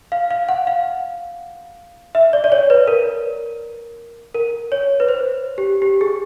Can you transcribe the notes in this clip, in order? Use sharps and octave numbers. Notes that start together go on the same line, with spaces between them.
F5
F5
F#5
F5
E5
D5
D5
C#5
B4
A#4
A#4
C#5
B4
C5
G4
G4
G#4